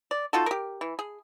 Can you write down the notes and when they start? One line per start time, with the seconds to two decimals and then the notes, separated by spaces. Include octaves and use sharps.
0.11 D5
0.33 D#4 F4 F#4 A4
0.46 G4 A#4
0.81 E3
0.99 G#4